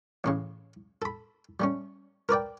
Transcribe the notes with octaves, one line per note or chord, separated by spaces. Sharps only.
A1 A2 C#3
A4 B5
G3 A3 C#4
A#4 B4 D5 G5